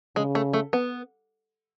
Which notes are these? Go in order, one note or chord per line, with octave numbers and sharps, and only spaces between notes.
C#3 G#3
A3
A3
B3